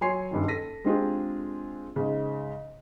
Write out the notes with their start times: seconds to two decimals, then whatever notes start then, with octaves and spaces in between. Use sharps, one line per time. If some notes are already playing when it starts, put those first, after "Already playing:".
0.01 F#3 C#5 G#5 C6 C7
0.31 F#1 G2 D#3
0.48 A4 A#6 B6 D#7
0.84 G#3 C4 D4 F4 G4 G#4
1.96 G#2 C#3